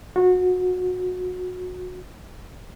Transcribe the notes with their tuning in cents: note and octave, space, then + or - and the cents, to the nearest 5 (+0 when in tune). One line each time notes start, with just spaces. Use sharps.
F#4 -25